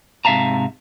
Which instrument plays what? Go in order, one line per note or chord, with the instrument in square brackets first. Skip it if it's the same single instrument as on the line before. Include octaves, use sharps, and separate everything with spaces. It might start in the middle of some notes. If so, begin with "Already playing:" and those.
[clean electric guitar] G#2 C3 E5 F5 A5 A#5